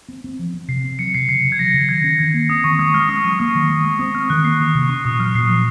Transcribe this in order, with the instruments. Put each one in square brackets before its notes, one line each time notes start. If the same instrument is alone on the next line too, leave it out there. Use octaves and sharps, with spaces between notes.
[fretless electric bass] C4
C4
F3
C4
[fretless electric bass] C3 [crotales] C7
[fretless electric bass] C4
[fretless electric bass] F#3 [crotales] C#7
[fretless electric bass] C3 [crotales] C7
[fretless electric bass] C#3 [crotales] C7
[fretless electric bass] C#3
[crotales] G#6
[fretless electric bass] F#3 [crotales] A#6
[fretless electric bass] C#3
[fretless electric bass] D#3 [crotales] G#6
[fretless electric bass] C#4
[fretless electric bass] D#3 [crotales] G#6
[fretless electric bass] A#3
[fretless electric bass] C4 [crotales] D#6
[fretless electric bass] D#3 [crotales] C#6
[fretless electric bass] G#3 [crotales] D#6
[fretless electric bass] G#3 [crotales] F6
[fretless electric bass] C#4 [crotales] D#6
[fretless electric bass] F#3 [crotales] C#6
[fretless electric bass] A#3 [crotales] D#6
[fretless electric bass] D#3
G#3
[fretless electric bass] G#3 [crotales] D#6
[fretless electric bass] C4 [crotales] D#6
[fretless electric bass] C4 [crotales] F6
[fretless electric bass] D#3 [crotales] F#6
[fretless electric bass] A#3 [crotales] C7
[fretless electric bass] D#3 [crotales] D#6
[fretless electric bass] C3
[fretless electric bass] C#4 [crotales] C#6
[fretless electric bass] A#2 [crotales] D#6
[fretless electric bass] F#3 [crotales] F6
[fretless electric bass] A#2 [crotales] C7
[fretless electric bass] F3